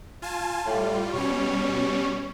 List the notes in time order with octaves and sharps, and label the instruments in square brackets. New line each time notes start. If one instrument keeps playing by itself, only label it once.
[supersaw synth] F4 G#5 A5
[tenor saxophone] A2 [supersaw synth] G3 F4
[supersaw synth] B2 G3 C#4 [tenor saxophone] C#5